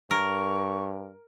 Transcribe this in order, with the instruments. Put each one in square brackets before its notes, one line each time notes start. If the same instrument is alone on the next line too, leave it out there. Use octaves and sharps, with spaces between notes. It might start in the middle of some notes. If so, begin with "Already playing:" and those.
[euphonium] G2 [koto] A#4 [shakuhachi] C#6